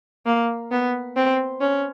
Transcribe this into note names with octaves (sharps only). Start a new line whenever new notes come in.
A#3
B3
C4
C#4